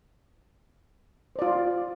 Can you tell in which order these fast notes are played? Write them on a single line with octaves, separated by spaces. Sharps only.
C5 D5 F4